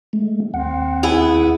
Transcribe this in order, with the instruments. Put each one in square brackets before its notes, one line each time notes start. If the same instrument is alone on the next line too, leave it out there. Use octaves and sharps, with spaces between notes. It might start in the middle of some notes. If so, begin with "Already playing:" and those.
[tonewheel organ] G#3 A3
[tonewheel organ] D#2 F#5 [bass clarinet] C4
[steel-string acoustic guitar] B3 E4 G#4